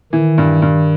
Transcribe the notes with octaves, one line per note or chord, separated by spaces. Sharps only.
D#3 E3
G2
G2